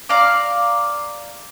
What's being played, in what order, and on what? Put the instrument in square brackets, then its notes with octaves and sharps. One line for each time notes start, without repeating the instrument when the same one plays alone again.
[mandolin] D5 F5 A#5 D6